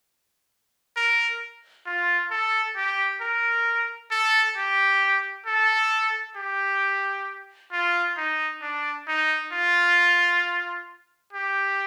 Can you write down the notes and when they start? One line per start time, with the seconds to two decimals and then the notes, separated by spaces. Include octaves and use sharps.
0.96 A#4
1.86 F4
2.31 A4
2.76 G4
3.21 A#4
4.11 A4
4.57 G4
5.46 A4
6.36 G4
7.72 F4
8.17 D#4
8.62 D4
9.07 D#4
9.52 F4
11.33 G4